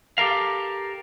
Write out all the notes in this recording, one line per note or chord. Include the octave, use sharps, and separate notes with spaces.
G4 A4 A#4 F5